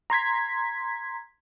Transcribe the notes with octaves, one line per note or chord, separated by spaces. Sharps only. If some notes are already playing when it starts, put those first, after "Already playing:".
A#5 C6 G#6 B6